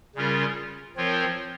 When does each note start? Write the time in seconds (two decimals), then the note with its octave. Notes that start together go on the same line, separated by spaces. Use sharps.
0.15 C#3 G3 C#4 F4 A#4
0.96 F3 C4 F4 A#4 C#5